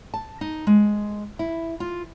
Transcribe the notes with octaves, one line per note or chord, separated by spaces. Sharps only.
A5
D#4
G#3
E4
F4